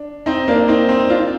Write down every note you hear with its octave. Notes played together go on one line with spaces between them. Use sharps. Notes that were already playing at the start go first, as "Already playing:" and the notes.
Already playing: D4
C4 D#4
A#3 D4
C4 D#4
C4 D#4
D4 F4